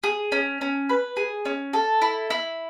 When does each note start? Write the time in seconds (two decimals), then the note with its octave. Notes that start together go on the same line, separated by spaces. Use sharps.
0.03 G#4
0.32 C#4
0.61 C#4
0.89 B4
1.17 G#4
1.45 C#4
1.73 A4
2.02 E4
2.30 E4